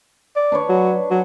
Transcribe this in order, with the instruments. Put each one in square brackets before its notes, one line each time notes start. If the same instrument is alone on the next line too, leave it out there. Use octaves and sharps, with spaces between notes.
[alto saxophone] D5
[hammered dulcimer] D4 B4 C#5
[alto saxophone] F#3
F#3